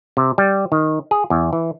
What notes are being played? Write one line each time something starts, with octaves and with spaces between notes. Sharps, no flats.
C3
G3
D#3
G#4
E2
E3